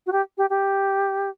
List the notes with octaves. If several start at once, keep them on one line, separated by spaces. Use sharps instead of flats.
F#4
G4
G4
G4